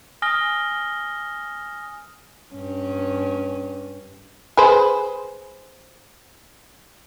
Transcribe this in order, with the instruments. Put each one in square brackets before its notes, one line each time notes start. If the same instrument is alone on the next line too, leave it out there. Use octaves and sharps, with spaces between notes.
[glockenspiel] G#5 D#6 F6 A#6 G7
[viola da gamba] G2 C#4
[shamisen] G#4 B4 C5